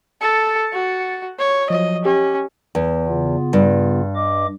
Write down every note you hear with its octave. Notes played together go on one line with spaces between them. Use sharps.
A4 A6 C#7
F#4
C#5
F3 F#3 D#5
C#4 G4
E2
C#3 B3 F4
G2
D#5 D6